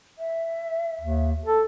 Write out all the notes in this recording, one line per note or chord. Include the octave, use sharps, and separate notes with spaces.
E5
D#2
A4